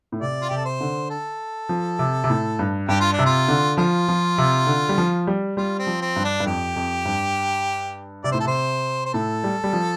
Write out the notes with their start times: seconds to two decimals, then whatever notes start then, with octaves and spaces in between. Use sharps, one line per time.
0.12 A2
0.21 C3 D5
0.42 F4
0.49 C3 G4
0.57 A4
0.65 C5
0.81 D3
1.10 A4
1.69 F3
1.99 C3
2.24 C3
2.30 A2
2.59 G2
2.89 G2 G4
3.00 F4
3.13 D4
3.19 C3
3.26 F4
3.48 D3
3.77 F3 F4
4.08 F3
4.38 C3
4.67 D3
4.89 G3
4.98 F3
5.27 G3
5.57 G3 F4
5.79 C4
5.87 F3
6.01 C4
6.16 G2
6.24 D4
6.40 G2
6.46 F2 G4
6.76 F2
7.05 G2
8.24 C3 D5
8.32 A2 C5
8.40 A4
8.45 C3 C5
9.05 C5
9.13 A2 A4
9.44 G3
9.64 G3
9.73 F3